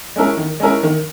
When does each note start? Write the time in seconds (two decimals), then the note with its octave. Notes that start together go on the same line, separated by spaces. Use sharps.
0.16 G#3 C#4 E4 A#4
0.37 D#3
0.60 G#3 C#4 E4 A#4
0.83 D#3